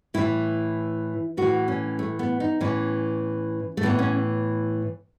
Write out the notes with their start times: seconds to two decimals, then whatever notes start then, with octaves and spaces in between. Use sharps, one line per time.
0.14 A2 E3 E4
1.37 A2 E3 F#4
1.68 C#4
1.99 A3
2.19 B3
2.40 D#4
2.60 A2 E3 C#4
3.77 A3
3.83 A2 E3 B3
3.99 C#4